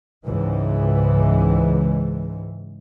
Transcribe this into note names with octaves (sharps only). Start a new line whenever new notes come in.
C#2 G#2 E3